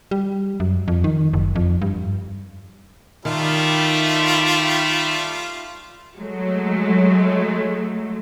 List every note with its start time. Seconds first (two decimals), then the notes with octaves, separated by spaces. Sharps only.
0.11 G3
0.60 F#2
0.88 F2
1.04 D#3
1.33 F#1
1.56 F2
1.82 G2
3.25 D#3 G3 A3 F4
6.16 F#3 G#3 A3